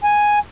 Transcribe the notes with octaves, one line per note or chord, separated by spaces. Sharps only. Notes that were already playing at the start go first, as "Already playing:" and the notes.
G#5